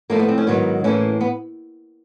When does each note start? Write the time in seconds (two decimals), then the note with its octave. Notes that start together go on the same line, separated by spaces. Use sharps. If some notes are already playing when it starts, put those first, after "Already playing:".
0.10 A2 F3 A3 A#3
0.19 B3
0.28 C4
0.38 C#4
0.47 G#2 D#3 F#3 B3
0.84 A2 E3 G3 A#3 C#4
1.21 B3